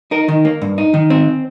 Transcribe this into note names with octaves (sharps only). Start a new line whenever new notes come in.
D#4 A#4
D#3
A#3
G2
D#4
D#3
C4